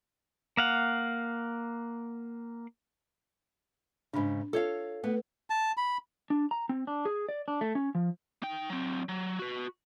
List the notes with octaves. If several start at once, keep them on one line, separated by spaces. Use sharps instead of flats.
A#3 F5 F#5
G#2 C#3 D4 B5
F4 A4 C#5 F5
A3 B3 B4
A5
B5
D4
A#5
C4
D4
G#4
D5
D4
A3
C#4
F3
D#4 G5
F#3 C4
F#3
F#4 B4